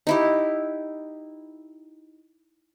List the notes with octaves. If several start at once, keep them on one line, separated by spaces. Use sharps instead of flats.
D#4 E4 G4